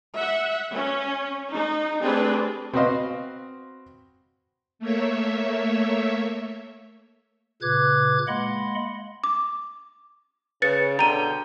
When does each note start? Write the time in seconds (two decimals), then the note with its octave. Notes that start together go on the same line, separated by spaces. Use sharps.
0.17 E5 F#5
0.75 C#4
1.51 D#4
2.00 A3 C4 D4 G4 G#4 B4
2.74 C4 F#4 B4 C5 D#5 F5
4.79 A3 A#3 C#5 E5
7.62 A#2 C#3 B4 D6 F#6 G#6
8.28 G#3 A#3 D#5 F#5 B5 C6
9.24 D6
10.62 C#3 B4 A6 C#7
10.99 B2 D3 G5 A#5 D#7